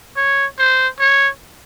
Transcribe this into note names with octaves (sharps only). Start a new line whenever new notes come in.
C#5
C5
C#5